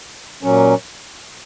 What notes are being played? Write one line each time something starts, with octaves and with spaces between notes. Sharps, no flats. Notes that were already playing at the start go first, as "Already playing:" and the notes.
A#2 F#3 C#4